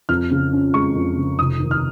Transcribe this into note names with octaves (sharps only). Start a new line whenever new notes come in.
F2 F6
C#3
C#4
G#3 C#6
F2
C#3
F1 D#6
D#2
F6